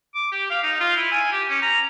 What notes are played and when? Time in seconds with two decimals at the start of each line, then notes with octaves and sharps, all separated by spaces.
0.15 D6
0.32 G4
0.50 F5
0.63 D#4
0.81 F4
0.96 E4
1.12 G#5
1.32 G4
1.50 C#4
1.62 A#5